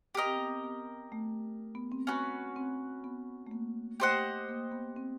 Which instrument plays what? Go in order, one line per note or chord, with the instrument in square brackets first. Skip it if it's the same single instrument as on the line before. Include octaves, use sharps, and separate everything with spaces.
[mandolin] G4 A#4 D#5
[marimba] C4
B3
C4
B3
A3
B3
C4
[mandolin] C#4 F#4 B4
[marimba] C4
B3
A3
A#3
[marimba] A3 [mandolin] G4 C5 D#5 F#5
[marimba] A#3
B3
C4